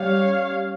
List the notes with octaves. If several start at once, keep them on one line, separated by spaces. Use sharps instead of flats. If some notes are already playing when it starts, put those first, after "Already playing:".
Already playing: G3 C#4 C#5 F5